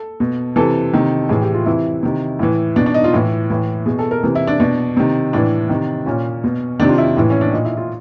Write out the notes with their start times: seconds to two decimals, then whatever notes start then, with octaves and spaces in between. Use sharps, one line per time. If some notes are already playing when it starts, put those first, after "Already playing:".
Already playing: A4
0.20 B2
0.56 C3 E3 A4
0.93 C3 D#3
1.29 A2 E3 G#4
1.42 G4
1.54 F4
1.66 C3 E3 E4
2.03 C3 D#3
2.39 A2 E3
2.76 B2 D4
2.86 D4
2.94 D#4
3.04 F4
3.13 A2 E3
3.50 A2 E3
3.86 B2 G#4
3.99 A4
4.11 A#4
4.23 C3 E3
4.35 E4
4.47 D4
4.60 B2 D4
4.97 C3 D#3
5.33 A2 E3 D4
5.69 C3 D#3
6.06 A#2 C#4
6.44 B2
6.79 C3 D#3 D4
6.89 F4
6.98 E4
7.17 A2 E3
7.30 C#4
7.41 D4
7.53 A#2 D#4
7.65 E4
7.77 F4